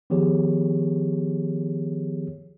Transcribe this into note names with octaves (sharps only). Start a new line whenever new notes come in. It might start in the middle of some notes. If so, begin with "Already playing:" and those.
D#3 F3 B3 G4 G#4 C#5